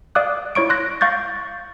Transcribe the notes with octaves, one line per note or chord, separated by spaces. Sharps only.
D5 F5 D6 D#6 F#6
E4 C#5 C#6 D7
C6 F#6 A#6
F5 C#6 G6 A6